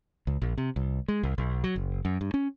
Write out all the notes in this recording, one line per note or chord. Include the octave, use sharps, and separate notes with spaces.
C#2
A#1
C3
C2
G#3
C2
B1
F#3
F#1
F#2
G2
C#4